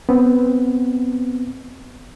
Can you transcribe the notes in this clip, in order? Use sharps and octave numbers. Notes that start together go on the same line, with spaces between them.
B3 C4